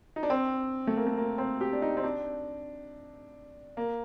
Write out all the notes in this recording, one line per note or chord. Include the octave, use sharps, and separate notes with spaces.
D#4
D4
C4
A3
A#3
A3
A#3
C4
G4
D4
D#4
C4
D4
A#3